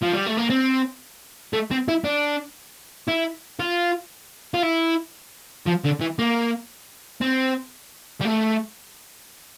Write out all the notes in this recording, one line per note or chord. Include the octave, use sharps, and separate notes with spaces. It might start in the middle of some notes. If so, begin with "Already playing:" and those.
F3
G3
A3
A#3
C4
A3
C4
E4
D4
E4
F4
F4
E4
F3
D3
E3
A#3
C4
G3
A3